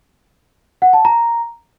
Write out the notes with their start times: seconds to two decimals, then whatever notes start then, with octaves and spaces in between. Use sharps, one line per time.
0.82 F#5
0.93 A5
1.05 A#5